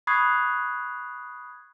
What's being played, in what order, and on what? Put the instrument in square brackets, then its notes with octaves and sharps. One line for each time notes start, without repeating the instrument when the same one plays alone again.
[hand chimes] B5 C#6 D#6 F#6 G#6 C7